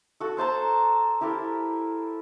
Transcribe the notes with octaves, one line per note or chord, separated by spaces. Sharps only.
F#4 A4
A4 C5 A5 A#5
E4 G4 A4 A#4